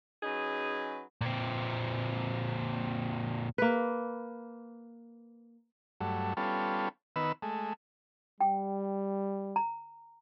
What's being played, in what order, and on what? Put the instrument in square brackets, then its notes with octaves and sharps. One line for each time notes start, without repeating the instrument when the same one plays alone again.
[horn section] F#3 C#4 D#4 G#4 B4
[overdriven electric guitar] A#2 C4
[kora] A#3 B4
[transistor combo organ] G2 F#3 A3
G3 B3 C#4 F4 A4
D#3 B3 B4 E6
G#3 A3
[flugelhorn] G3 [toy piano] G5
[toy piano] A#5